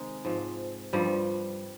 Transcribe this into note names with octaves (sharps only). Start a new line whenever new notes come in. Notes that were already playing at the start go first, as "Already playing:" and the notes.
Already playing: C3 D#3 G#3
G#2 F3
G2 F3 G3